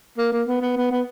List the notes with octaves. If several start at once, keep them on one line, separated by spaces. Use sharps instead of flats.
A#3
A#3
B3
B3
B3
B3